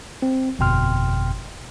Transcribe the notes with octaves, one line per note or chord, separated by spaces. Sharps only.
C4
G1 F2 B2 G5 C6 F6